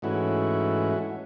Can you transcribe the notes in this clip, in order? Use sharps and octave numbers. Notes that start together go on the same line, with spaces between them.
G#2 E3 A3 C#4 E4 F#4